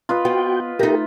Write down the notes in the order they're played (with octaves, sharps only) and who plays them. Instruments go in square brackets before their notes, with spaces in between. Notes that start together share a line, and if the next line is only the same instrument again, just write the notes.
[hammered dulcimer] F4 B4 D#5
[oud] B3 [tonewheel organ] F#4 G5
[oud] A3 D#4 [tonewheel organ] G4 A#4